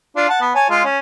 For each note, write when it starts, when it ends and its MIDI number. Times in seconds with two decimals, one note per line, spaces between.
0.16 0.25 62
0.16 0.25 65
0.29 0.40 78
0.29 0.40 81
0.41 0.51 59
0.55 0.67 73
0.55 0.67 80
0.55 0.67 81
0.70 0.83 56
0.70 0.83 65
0.85 0.99 61